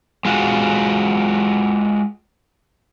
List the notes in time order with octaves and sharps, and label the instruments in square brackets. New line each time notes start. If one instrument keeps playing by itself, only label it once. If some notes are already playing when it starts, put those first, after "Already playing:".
[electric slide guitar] G#3 F4 F#4